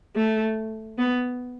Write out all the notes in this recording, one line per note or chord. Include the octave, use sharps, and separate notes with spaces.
A3
B3